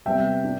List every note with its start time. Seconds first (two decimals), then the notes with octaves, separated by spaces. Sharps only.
0.05 C3 G3 B3 E5 G5
0.44 D4